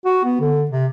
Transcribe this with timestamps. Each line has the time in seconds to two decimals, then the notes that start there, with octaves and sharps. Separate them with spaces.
0.05 F#4
0.25 B3
0.41 D3
0.71 C3